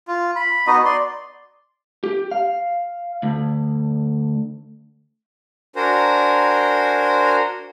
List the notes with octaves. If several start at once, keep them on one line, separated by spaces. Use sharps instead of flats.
F4
B5
B3 D#4 F#4 D#5
D5 C6
G4
F5
D2
D4 F#4 A#4 C5 G#5 A#5